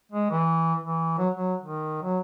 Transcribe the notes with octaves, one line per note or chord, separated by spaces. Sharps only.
G#3
E3
E3
F#3
F#3
D#3
F#3